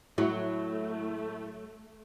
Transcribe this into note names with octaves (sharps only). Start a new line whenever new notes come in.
A2 F#3 A3 E4